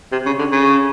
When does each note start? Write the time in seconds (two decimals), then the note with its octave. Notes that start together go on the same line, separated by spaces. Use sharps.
0.12 C3
0.26 C#3
0.39 D3
0.52 C#3